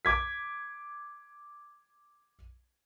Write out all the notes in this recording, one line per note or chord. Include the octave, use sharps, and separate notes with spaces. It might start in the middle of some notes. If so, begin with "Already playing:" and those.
D6 G#6 B6